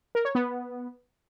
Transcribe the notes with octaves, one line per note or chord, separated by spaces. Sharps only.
A#4
C#5
B3